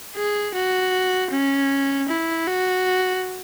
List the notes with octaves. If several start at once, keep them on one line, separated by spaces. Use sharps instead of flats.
G#4
F#4
C#4
E4
F#4